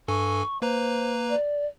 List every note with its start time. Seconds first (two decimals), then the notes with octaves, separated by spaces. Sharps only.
0.08 G2 A4 G#5 C#6
0.62 A#3 B4 C5 A#5
1.29 D5